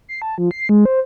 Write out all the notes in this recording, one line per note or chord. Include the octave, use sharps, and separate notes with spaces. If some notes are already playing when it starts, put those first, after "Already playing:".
C7
A5
F3
C7
G#3
C5